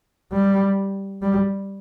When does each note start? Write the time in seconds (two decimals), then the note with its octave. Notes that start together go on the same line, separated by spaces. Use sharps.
0.32 G3
1.22 G3